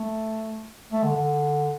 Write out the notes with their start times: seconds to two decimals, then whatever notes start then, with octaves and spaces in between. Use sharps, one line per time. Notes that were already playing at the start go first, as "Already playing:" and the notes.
Already playing: A3
0.93 A3
1.04 D3
1.16 D3